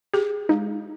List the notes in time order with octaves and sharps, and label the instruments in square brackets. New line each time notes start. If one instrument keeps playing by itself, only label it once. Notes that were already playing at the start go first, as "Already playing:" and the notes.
[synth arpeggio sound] G4 [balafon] G#4
[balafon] G#3 [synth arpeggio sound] D#4